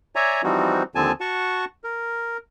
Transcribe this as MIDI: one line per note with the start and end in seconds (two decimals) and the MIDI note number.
0.15 0.41 73
0.15 0.41 74
0.15 0.41 76
0.15 0.41 80
0.15 0.41 82
0.44 0.83 52
0.44 0.83 53
0.44 0.83 55
0.44 0.83 60
0.44 0.83 63
0.44 0.83 66
0.95 1.12 39
0.95 1.12 50
0.95 1.12 53
0.95 1.12 60
0.95 1.12 80
0.95 1.12 81
1.21 1.65 66
1.21 1.65 78
1.21 1.65 81
1.21 1.65 85
1.84 2.37 70